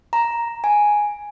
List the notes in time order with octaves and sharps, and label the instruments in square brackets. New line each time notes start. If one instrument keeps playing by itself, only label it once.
[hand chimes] A#5
G#5